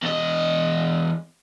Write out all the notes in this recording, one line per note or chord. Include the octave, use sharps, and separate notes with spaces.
E2 D#5